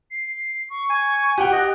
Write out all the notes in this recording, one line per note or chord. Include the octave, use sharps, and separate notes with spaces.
C7
C#6
G#5
G4 F#5 G5
D#5 F#6